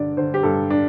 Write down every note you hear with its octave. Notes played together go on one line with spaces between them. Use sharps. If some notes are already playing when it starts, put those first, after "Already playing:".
Already playing: G2 D3 D5
D3 C5
G4
G2 A4
D4